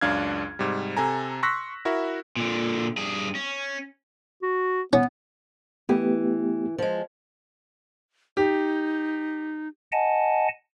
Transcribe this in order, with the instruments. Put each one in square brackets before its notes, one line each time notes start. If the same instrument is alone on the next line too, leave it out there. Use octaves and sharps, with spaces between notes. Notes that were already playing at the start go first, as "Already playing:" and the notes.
[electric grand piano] C#2 F#2 D4 F5 F6 G#6
G#2 C3 G3
C3 A4 G#5 A#5
C6 C#6 E6 F#6 A#6 B6
E4 F#4 A#4 E5
[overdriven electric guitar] A#2 D3
G2 G#4
C#4
[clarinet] F#4
[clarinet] B3 [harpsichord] C#4
[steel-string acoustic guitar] E3 [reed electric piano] A3 B3 G4
[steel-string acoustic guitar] F3 G#3
[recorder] D#4 [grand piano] G4
[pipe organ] D#5 F#5 G#5 A5